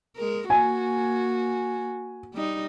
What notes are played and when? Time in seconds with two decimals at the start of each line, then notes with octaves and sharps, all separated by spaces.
0.16 G#3 A#4
0.50 A#3 F#4 G#5
2.34 G3 D#4